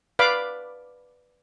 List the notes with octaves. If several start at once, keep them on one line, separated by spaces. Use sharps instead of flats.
B4 D5 F5 B5 D6